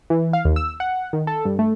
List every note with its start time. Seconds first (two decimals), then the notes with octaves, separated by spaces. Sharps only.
0.10 E3
0.33 F5
0.45 D#2
0.56 E6
0.80 F#5
1.13 D#3
1.27 A4
1.45 G2
1.59 A3